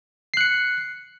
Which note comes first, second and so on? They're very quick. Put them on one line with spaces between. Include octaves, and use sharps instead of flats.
C7 F#6 C#7